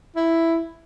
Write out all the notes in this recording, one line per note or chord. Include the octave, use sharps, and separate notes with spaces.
E4